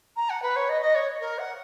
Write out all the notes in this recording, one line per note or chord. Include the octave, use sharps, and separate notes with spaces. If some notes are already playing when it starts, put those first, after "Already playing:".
A#5
F#5
B4
C#5
D#5
D#5
C#5
A#4
F#5